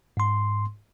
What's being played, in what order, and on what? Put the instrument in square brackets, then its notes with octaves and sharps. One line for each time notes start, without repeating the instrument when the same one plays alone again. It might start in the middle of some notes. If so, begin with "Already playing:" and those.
[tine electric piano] G#2 C6